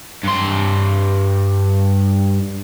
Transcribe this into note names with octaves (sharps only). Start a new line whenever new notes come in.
G2 C6